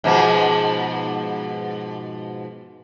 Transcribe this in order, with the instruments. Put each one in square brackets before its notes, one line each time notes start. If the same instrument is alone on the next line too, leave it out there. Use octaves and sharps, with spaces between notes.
[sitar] G#2 B2 F3